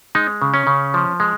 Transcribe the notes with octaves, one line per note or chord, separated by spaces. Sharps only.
G#3 D#4
C#3
C#4
C#3
F3
G#3